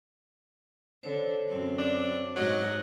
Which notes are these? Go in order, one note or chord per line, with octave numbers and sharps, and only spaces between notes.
D3 C5 C#5
F#2 C4
D4
G#2 F#3 D#5